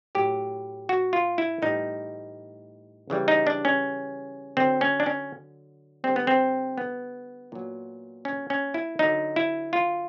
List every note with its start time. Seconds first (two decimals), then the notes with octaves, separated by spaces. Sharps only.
0.15 A2 F#3 G4
0.89 F#4
1.13 F4
1.38 E4
1.62 A2 E3 G3 D#4
3.10 C#3 E3 G3
3.28 D#4
3.47 D4
3.65 C#4
4.57 D3 F#3 C4
4.81 C#4
5.00 D4
5.06 C#4
6.04 D3 G3 C4
6.16 B3
6.27 C4
6.78 B3
7.52 A#2 F#3
8.25 C#4
8.50 C#4
8.74 E4
8.99 D3 F#3 D#4
9.36 E4
9.73 F4